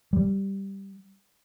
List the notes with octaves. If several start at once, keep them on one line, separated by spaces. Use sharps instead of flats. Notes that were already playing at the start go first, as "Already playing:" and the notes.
G3